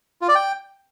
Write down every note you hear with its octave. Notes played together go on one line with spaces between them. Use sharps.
F4
D5
G5